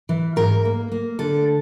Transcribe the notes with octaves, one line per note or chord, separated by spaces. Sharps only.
E3
G#2 A#4
A#3
A#3
D3 A4